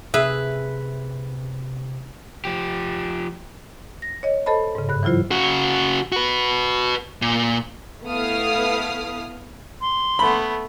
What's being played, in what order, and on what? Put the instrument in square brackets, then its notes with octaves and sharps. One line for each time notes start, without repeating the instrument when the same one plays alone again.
[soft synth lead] C3 [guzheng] G#4 [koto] B4 [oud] E5
[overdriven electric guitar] F3 G4
[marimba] A#6
C#5 D#5
A4 C5 D#5 A5 B5
G#2 C#3
G2 F#6
E3 F#3 E4 F4 C5
[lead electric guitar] C#3 F#4
F#4 B4
A#2
[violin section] A3 B3 E4 F5 D#6 F6
[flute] C6
[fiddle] A3 B3 [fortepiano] B5